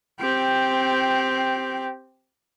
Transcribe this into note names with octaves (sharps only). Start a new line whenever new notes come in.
C4 G4